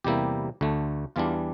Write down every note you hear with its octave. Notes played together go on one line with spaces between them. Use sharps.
E2 C3 G3 A#3 E4 G4
D2 D3 A3
E2 E3 G3 D4 F4